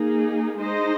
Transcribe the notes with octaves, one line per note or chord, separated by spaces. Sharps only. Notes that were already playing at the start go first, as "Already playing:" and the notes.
Already playing: A#3 D#4 G#4
G#3 D#4 C5 D#5